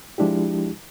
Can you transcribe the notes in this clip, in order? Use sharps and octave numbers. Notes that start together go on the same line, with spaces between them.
F3 G#3 D4 E4 G4